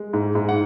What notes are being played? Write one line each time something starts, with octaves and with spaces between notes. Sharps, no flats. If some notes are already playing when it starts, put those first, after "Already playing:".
Already playing: G#3
G#2
G#2
F#5